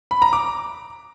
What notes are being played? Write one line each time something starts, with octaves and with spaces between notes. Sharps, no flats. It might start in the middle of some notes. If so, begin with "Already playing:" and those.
B5
A#5
D6